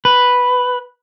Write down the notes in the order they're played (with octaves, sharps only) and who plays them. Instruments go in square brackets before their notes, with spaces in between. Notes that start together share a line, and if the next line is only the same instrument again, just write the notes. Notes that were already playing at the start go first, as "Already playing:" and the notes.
[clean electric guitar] B4